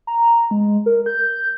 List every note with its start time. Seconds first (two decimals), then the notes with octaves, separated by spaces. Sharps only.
0.07 A#5
0.51 G#3
0.86 A#4
1.06 G6